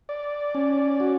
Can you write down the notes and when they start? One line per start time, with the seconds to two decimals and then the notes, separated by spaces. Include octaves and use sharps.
0.09 D5
0.55 C#4
1.00 F#4